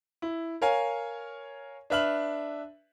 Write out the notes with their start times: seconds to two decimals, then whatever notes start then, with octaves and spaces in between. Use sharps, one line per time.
0.22 E4
0.62 A#4 C#5 F5 G#5
1.90 D4 B4 E5 F6 F#7